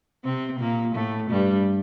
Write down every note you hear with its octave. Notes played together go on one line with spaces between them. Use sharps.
C3 C4
A#2 A#3
A2 A3
G2 G3